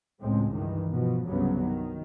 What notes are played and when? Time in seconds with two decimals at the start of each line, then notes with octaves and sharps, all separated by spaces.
0.21 C#2 A2 G#3 C4
0.54 G2 D#3 E3
0.91 B2 F3
1.27 C2 G2 C#3 F#3 B3
1.65 D#3